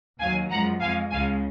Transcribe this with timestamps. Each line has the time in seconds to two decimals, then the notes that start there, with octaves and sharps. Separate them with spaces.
0.20 D#2 D#3 F#3 F5 G#5
0.51 F#2 F3 G#3 F#5 A#5
0.81 F2 F3 G#3 F5 G#5
1.11 C#2 C#3 G#3 F5 G#5